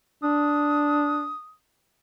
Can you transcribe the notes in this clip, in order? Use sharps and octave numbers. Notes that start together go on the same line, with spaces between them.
D4 D#6